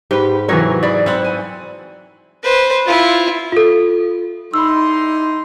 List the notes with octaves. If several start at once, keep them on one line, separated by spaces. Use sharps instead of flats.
G#2 G4 B4
C3 E3 F#3 A#4 C#5
E4 G#4 D5
C4 E4 F#5
G#5
B4 C5
E4 F4
F4 A4
G3 D#4 E4 B5 C6 E6